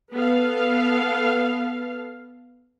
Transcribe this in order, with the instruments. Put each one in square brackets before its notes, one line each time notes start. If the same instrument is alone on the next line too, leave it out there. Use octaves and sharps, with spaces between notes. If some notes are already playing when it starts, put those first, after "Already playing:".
[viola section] B3 A4 F5